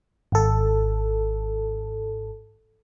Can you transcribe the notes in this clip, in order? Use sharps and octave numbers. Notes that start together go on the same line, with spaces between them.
G#1 A4